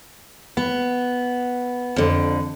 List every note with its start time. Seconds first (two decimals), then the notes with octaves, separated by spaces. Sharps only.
0.57 B3
1.96 F2 D3